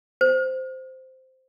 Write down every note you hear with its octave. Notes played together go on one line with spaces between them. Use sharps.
C5